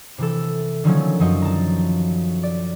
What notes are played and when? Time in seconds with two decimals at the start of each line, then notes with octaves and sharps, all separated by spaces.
0.18 C3 E3 A4
0.84 D3 D#3 F3 F#3 A3 C#4
1.20 F#2 F3 F#4 D#5
1.42 A5 A#5
2.43 D5